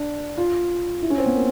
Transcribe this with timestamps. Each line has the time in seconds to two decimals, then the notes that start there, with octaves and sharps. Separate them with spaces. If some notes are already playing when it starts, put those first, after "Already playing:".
Already playing: D4
0.38 F4
1.02 E4
1.10 C#4
1.18 C4
1.26 B3
1.34 A#3